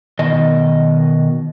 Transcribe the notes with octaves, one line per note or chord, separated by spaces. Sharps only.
B2 D#3 D#5